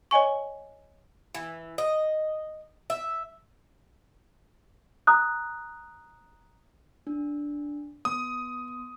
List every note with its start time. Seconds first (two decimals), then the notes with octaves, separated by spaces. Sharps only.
0.11 C#5 D#5 G#5 C#6
1.34 E3
1.78 D#5
2.90 E5
5.07 A#5 D#6 F#6
7.07 D4
8.05 B3 C6 D6 D#6